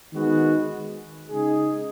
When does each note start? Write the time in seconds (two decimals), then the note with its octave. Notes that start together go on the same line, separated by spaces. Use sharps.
0.12 D#3 G#3 B3 F#4
1.29 C#3 G#3 D#4 G#4